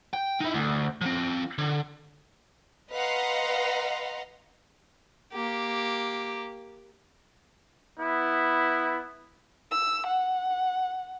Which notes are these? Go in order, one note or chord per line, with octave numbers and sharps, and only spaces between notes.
G5
D#4 E4
D2
F3 C4
D3
B4 D#5 F5 F#5 A#5 C6
A#3 G4
B3 E4
E6
F#5